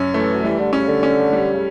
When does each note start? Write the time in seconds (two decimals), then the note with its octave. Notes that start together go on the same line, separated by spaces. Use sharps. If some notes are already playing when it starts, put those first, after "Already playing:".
Already playing: F#2 C#4
0.14 E3 A3
0.33 F#3
0.44 E3 G3
0.59 D3
0.73 C#3 C#4
0.88 D3
1.03 C#4
1.33 G3
1.54 C#3